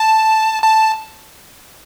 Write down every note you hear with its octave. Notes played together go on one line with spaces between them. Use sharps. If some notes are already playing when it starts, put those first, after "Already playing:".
Already playing: A5
A5